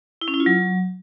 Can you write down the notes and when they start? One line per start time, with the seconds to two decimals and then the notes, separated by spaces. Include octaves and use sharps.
0.21 E4
0.28 C#4
0.34 E4
0.40 F4
0.46 F#3